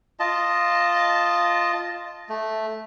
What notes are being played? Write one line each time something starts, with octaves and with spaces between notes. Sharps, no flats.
F4 D#5 A5
A3